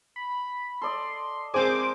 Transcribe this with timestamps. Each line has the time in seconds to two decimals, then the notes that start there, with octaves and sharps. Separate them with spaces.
0.16 B5
0.82 A4 D5 D#5 C6
1.54 F3 G#3 C4 G#4 A#4 C5 G#5 D6